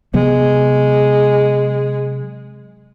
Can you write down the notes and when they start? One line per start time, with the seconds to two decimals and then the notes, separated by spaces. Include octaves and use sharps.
0.14 C3 F#3 G#3 B3